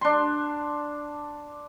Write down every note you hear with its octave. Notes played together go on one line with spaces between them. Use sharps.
D4 C6